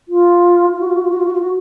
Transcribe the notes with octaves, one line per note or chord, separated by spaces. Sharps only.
F4
F4
F#4
F4
F#4
F4
F#4
F4
F#4
F4
F#4